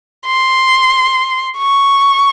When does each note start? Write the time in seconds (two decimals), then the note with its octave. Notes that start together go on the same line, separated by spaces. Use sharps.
0.27 C6
1.58 C#6